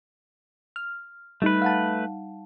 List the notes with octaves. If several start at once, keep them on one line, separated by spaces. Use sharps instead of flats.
F6
G3 A3 D#4 B4
F5 F#5 A5